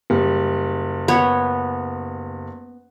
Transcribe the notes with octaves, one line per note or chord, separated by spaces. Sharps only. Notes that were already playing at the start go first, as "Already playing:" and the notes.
F#1 G3
B3 C#5